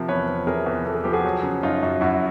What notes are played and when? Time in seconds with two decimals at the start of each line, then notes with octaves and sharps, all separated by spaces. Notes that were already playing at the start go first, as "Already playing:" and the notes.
Already playing: C3 F3 A#4
0.08 E2 B4 C#5
0.28 F3
0.47 C3 G#4 A#4
0.66 E2
0.85 E2 A4
0.95 G#4
1.04 F3 G4
1.13 F#4 G#4
1.25 F#3
1.43 C#3
1.63 F#2 D#4 F4
1.83 F#2
2.01 F#2 E4 F#4